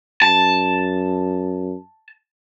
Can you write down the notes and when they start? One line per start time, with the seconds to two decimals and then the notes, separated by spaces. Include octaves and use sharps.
0.22 F#2 A5